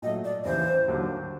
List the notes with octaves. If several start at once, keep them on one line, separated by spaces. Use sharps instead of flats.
A#2 F#3 A3 D#5
D5
D#2 C#3 E3 C5
D#2 D3 F#3 A#3 D4